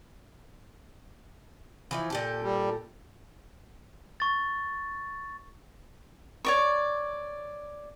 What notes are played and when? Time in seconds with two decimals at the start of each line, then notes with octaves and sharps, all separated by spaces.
1.91 E3 F3 E4
2.10 A#2 G4 A4
2.42 G3
4.20 C#6 A6
6.45 C#5 D5 C#6